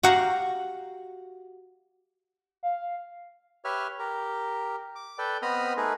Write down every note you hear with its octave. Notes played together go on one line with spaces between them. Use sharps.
F#4 G4 F5 F#5 A#5
F5
G4 B4 C#5 E5 F6
G4 A#4
D6
A4 B4 D5 G5
B3 C4 D#5 B5 D#6 F6
A3 D#4 G#4 A#4 B4